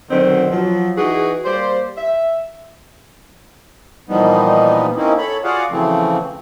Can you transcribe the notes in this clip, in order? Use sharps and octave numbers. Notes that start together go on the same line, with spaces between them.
B2 D3 D#3 F#3 C4
F3 F#3
E3 D#4 F#4 G#4
G3 A#3 C5
E5
A#2 E3 F3 G3 B3 D#4
A#3 C4 C#4 D#4 E4
A4 C#5 B5
F4 F#4 G#4 D5 F5 F#5
C#3 E3 F3 A3 C4